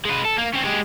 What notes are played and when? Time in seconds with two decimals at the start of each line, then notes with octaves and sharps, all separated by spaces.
0.05 G#3 B4
0.25 A4
0.38 A#3
0.53 C4 C#4
0.65 G#3 G4